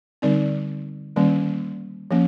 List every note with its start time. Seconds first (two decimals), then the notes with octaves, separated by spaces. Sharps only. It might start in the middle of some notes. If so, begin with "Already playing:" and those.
0.22 D3 G3 C4 D#4 D5
1.16 D#3 G3 A#3 C#4
2.11 F3 A#3 C#4